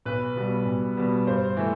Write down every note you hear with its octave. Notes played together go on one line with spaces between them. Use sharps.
B1 B4
B2 G3 B3
B1
B2 G3 B3
G2 C5
E3 A3